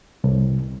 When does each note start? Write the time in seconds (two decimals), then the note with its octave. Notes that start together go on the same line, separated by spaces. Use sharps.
0.24 C2